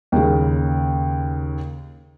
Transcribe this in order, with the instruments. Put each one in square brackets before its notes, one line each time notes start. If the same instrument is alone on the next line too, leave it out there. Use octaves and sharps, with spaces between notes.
[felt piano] D#2 C#3